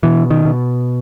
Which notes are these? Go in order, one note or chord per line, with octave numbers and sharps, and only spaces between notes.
B2 E3
D#3
B2